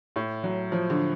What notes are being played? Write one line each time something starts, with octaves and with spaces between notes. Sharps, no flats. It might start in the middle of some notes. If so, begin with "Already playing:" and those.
A2
F#3
F3
D3